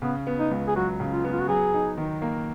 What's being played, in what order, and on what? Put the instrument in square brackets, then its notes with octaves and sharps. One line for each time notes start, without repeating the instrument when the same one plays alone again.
[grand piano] C#3 [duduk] B3
[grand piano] B3
[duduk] D#4
[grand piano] C#2
[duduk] G#4
[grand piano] F#3 [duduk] F#4
[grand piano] C#3
[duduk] F4
[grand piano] B3
[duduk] F4
F#4
[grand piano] F#3 [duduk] G#4
[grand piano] D#4
D#3
A#3